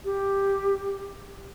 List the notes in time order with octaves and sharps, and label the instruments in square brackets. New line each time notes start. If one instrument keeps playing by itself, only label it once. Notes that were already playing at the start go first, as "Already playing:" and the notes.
[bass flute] G4